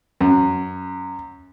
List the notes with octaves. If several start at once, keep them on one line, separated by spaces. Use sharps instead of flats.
F#2